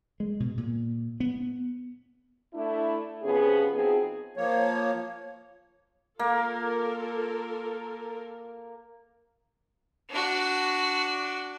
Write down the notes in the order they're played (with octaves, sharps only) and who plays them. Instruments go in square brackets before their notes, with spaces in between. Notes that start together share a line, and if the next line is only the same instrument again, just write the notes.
[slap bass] G#3
B2
A#2
B3
[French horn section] A3 D4 E4
C3 F3 B3 C#4 G#4
B2 F3 C4 D#4 G#4
[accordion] F3 A#3 C#5
[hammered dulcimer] A#3 [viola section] F4 A4 A#4
[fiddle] D4 F#4